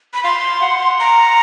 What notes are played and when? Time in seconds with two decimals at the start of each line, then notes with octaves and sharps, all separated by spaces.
0.14 B5
0.24 F5 C6
0.62 F#5
1.00 A#5